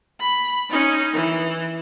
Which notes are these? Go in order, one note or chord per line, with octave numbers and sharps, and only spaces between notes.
B5
C#4 D#4
E3